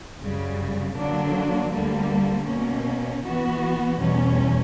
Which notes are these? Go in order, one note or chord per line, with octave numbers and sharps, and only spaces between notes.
F#2 C#3 G3
D3 F#3 A#3 D4
D2 D3 G3 A#3
B2 A#3 C#4
E3 B3 F#4
E2 B2 G3 C#4